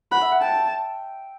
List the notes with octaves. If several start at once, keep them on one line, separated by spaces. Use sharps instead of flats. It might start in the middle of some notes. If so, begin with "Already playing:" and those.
F#5 B5
E5
F#5
G5 A5